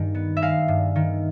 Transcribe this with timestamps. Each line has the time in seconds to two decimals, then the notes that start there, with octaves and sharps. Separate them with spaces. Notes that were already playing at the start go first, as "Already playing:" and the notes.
Already playing: G2 D#3 G#3
0.15 B3
0.37 E5
0.42 G#3 F5
0.68 G2
0.96 D#3